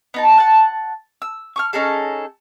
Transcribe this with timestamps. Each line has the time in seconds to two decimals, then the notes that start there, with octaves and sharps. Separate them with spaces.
0.14 B3 D#4 A5
0.38 F#5 A5
1.22 E6
1.56 C#6 D6 F6
1.73 C#4 D#4 G#4 A4